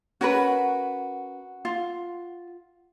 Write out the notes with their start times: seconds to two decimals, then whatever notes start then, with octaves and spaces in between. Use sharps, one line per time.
0.21 C#4 F#4 A#4 B4
1.65 F4